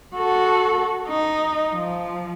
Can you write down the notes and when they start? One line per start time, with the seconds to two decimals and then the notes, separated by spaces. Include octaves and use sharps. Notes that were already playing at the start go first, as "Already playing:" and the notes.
0.16 F#4 A4
1.08 D#4
1.73 F3